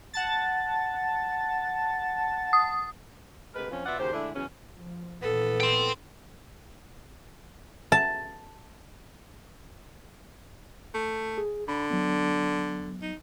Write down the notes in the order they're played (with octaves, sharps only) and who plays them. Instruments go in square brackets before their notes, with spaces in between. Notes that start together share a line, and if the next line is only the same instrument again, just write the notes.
[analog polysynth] F#5 A5 A6
[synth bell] D#6
[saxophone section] D2 C3 G#3 A#4 B4
F2 F3 C#4
B2 F4 B4 D5 E5 F#5
D#2 C#3 F#4 G4 C5
D3 G#3 A3 D4 E4
E2 C#3 F#3 C#4
[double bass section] F3
[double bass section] A#1 E3 [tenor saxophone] B3 [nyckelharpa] A4
[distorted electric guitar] G5 C6
[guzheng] A5
[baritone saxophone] A3
[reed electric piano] G#4
[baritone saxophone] D3 [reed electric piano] B5
[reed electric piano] F#3 B3
[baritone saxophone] D#4